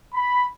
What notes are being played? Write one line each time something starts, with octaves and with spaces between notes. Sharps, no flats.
B5